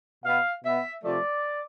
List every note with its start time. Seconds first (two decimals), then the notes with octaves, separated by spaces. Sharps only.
0.24 B2 B3 F5
0.64 B2 B3 E5
1.04 C3 F3 A3 D5